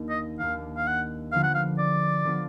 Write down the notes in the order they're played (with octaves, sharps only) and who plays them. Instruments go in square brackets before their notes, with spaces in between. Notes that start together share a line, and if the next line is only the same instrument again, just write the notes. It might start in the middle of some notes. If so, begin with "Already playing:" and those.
Already playing: [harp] D#2 D#3 A#3 D4
[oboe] D#5
[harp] D#2 D#3 A#3 D4 [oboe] F5
[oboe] F5
F#5
[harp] D3 F3 B3 D4 F4 [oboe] F5
[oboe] F#5
F5
D5
[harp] D3 F3 B3 D4 F4